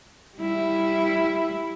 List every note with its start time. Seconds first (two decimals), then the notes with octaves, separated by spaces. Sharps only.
0.38 G3 E4